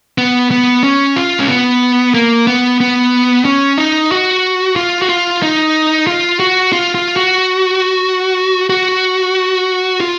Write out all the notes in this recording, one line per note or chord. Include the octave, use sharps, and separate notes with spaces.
B3
B3
C#4
F4
C#4
B3
A#3
B3
B3
C#4
D#4
F#4
F4
F#4
F4
D#4
F4
F#4
F4
F4
F#4
F#4
F4